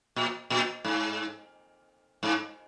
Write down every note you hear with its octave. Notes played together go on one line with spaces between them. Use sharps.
A#2
A#2
G#2
G#2